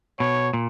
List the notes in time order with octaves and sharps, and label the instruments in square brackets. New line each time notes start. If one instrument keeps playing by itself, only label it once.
[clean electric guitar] B2 [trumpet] C#5
[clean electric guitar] A#2